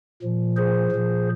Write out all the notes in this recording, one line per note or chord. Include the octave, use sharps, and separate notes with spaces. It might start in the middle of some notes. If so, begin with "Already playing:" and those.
A#2 F3
G#4 C5
A#2 F3